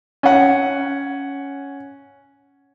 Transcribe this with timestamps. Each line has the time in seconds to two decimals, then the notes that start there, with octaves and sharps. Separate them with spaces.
0.23 C#4 F#5